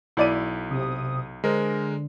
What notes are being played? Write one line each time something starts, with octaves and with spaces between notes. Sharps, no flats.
B1 E4 D5 D#7
C3 D#6
D3 G#3 A#4 C5